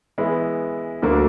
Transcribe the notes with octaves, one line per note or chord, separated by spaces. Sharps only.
E3 G#3 B3 E4
D2 D3 F#3 A#3 D4